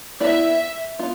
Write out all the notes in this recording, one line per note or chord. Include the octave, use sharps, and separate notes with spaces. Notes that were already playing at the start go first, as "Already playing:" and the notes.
B3 E4 B4 D5 E5
B3 F4